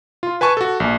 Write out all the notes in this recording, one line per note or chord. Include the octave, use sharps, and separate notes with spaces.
F4
B4 G#5 A5 C#6
F#4 A4
A#1 G#5